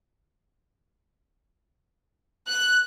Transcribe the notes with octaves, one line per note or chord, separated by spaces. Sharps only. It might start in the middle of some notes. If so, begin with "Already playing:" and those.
F#6